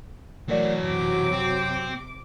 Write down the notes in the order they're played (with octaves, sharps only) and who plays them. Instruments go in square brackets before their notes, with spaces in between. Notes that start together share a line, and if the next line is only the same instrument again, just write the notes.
[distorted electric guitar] E3 F#4 [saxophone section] F#3 [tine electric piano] A3 A#4 D5
[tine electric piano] F#2 [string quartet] C3 D6
[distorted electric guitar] C4